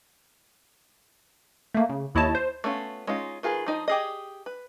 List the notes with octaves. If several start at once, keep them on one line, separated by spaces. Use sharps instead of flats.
A3 A#3
C#3
D#2 E4 C#5 D#5 A5
C5
A3 B3 C#4 D4 F4
G#3 C#4 D#4 F4
D#3 F4 G#4 B4
F3 D#4 D#5
G4 G#4 D#5
B4